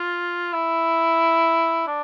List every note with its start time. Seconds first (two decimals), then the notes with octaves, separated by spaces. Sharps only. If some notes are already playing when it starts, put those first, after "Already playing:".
Already playing: F4
0.53 E4
1.87 D4